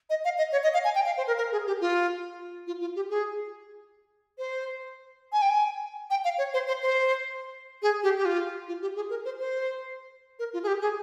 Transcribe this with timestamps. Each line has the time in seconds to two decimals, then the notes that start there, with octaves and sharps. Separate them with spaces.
0.10 D#5
0.25 F5
0.38 D#5
0.52 C#5
0.63 D#5
0.74 F5
0.84 G#5
0.95 G5
1.06 F5
1.17 C5
1.27 A#4
1.38 A#4
1.52 G#4
1.67 G4
1.81 F4
2.67 F4
2.81 F4
2.96 G4
3.10 G#4
4.38 C5
5.32 G#5
5.42 G5
5.50 G#5
6.10 G5
6.24 F5
6.38 C#5
6.54 C5
6.68 C5
6.82 C5
7.82 G#4
8.03 G4
8.18 G4
8.25 F4
8.68 F4
8.82 G4
8.96 G#4
9.10 A#4
9.25 C5
9.40 C5
10.39 A#4
10.53 F4
10.63 G#4
10.67 G4
10.82 G#4